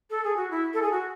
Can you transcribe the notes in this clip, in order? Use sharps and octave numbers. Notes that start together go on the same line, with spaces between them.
A4
G#4
F#4
E4
A4
G#4
F#4